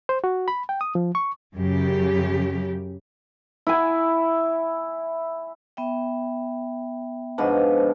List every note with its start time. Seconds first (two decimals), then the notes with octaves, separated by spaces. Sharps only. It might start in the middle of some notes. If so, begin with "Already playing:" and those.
0.09 C5
0.24 F#4
0.48 B5
0.69 G5
0.81 D#6
0.95 F3
1.15 C#6
1.54 F#2 C#3 G4
3.67 E4 G#5
5.77 B3 E5 G5
7.38 G#2 B2 F3 D4 D#5